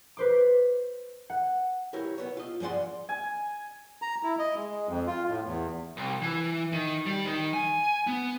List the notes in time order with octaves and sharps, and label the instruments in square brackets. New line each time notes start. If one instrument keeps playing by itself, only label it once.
[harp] B4 C5 D6
F#5
[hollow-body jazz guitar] E4 G4 A#4 C#5
B3 C#5
F4 D#5
G2 F3 G#4 D5 F#5 C6
[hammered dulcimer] G#5
[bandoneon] A#5
E4
D#5
G#3
F2
F4
A2
E2
[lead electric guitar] C2
E3
D#3
G3
D#3
G#5
B3